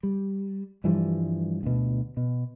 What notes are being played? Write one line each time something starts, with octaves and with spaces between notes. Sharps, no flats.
G3
G2 E3 F3 G3
D2 B2
B2